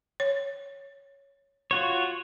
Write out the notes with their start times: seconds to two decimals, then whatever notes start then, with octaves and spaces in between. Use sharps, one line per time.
0.20 C#5
1.71 F4 F#4 C#5